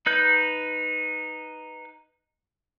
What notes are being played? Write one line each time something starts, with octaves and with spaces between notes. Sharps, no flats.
D#4 B4 G6